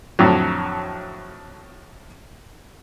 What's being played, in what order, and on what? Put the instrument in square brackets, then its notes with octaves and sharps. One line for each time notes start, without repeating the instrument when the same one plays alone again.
[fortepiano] F2 A2 D3 F#3